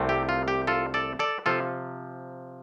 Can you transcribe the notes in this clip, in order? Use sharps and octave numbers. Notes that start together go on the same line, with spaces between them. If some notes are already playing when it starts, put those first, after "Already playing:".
Already playing: C2 C3 A3 C4
G4
F4
G4
F4 A4
A4 D5
A4 D5
C3 F3 F4 A4